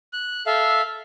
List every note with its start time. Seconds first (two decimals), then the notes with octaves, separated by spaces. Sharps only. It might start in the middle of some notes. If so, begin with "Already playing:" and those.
0.13 F#6
0.46 A4 E5 F5